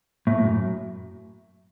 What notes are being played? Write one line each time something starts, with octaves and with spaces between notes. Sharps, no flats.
A2
F#2